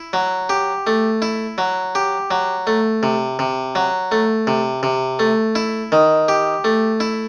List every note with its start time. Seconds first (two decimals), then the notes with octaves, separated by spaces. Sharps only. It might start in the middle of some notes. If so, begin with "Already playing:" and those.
Already playing: E4
0.13 F#3
0.49 G4
0.87 A3
1.22 E4
1.58 F#3
1.95 G4
2.31 F#3
2.67 A3
3.03 C3
3.39 C3
3.75 F#3
4.12 A3
4.47 C3
4.83 C3
5.19 A3
5.55 E4
5.92 D#3
6.28 G4
6.64 A3
7.00 E4